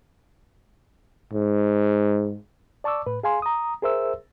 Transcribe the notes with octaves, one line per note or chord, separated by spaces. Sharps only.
G#2
D5 A5 C#6 D6 E6
A2 B4
G#4 F5 G#5 C6
A#5 D#6
G#4 A#4 C5 E5 E6